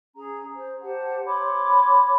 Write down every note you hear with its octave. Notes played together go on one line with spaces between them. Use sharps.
C#4 G#4 A#5
C5
G4 C5 F#5 A5
C#5 B5 C6 D6